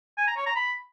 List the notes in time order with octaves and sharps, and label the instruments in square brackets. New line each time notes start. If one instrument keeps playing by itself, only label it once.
[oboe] G#5
A#5
C#5
A#5
B5